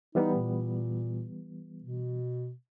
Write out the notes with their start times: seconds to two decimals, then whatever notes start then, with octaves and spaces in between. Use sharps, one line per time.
0.15 E3 G3 B3 D#4
0.34 A#2
1.82 B2